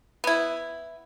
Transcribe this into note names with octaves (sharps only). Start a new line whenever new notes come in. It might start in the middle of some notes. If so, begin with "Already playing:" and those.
B3 E4